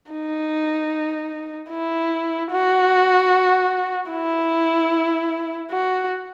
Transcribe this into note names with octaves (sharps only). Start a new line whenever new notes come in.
D#4
E4
F#4
E4
F#4